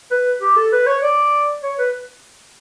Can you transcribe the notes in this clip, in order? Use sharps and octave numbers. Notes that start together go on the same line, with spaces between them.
B4
G4
A4
B4
C#5
D5
C#5
B4